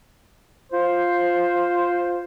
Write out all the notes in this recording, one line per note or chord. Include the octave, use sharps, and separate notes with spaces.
F4 C5